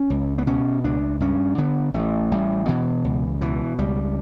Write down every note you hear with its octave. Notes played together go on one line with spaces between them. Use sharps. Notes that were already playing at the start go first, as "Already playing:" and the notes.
Already playing: C#4
C#2
B3
B2 C#4
C#2 D4
G2 C#4
D3 B3
A1 A3
A1 G3
B2 E3
C#2
B2 E3
C#2 G3